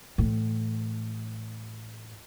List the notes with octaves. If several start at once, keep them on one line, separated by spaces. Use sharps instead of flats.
A2 E3